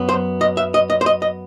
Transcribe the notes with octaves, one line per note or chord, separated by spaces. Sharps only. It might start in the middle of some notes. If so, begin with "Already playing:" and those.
Already playing: F#2 F#3 B3
C5
D#5
E5
D#5
D#5
C5
D#5
D#5